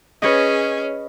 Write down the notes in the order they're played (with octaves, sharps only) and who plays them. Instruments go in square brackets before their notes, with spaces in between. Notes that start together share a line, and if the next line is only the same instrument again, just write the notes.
[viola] C#4 G#4 [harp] B4 C#5 D#5